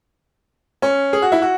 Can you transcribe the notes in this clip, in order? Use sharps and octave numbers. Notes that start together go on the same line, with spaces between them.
C#4
G#4
F#4
E4
F#4